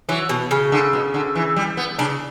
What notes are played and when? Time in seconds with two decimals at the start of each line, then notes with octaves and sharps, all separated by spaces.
0.09 E3 F#3
0.29 B2
0.51 C#3
0.72 D3
0.93 B2
1.14 D3
1.35 E3
1.56 G3
1.77 B3
1.98 C#3 D4